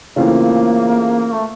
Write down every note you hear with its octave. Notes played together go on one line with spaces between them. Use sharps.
C#3 E3 A3 A#3 C4 F4
A3